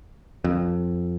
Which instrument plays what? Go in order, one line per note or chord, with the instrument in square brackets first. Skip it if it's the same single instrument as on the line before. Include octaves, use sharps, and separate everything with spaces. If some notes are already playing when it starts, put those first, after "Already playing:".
[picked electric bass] F2